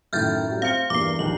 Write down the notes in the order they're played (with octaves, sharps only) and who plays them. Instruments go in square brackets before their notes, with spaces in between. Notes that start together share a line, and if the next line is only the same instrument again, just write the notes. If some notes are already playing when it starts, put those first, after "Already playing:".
[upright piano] F#2 A2 D#3 [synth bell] F6 G6 A6
[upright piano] A2 F#3 G3
[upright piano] C4 F6 C#7 [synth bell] F5
[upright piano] E2 G2 A#3 [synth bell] D6 C7
[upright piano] A#1 D#2 [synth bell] F#7